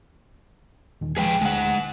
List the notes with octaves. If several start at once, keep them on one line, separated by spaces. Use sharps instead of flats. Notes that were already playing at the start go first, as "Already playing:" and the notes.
D#2 A#2 D#3
F3 G#3 G#4 B4 G5
D2 G#3 F#5